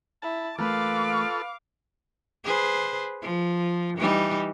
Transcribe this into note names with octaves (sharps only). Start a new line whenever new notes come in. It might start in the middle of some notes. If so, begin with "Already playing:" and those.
E4 A5
E2 A3 A#3 F4 A4 B4 F5 D6
G#4 B4 C5
F3
E3 G3 D#4